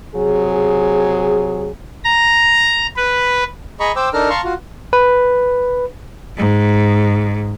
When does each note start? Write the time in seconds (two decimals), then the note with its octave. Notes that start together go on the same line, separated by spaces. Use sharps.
0.15 C3 F#3 G#4
2.05 A#5
2.96 B4
3.80 G#4 D#5 A#5 B5 C#6
3.96 C5 G5 D6 E6
4.13 D4 D#4 A4 A#4 A#5 F6
4.30 F5 A5 A#5 C6 C#6
4.44 F4 F#4
4.93 B4
6.37 G#2